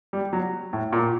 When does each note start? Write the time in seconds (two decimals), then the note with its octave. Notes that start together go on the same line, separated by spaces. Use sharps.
0.13 G3
0.33 F#3
0.73 A2
0.93 A#2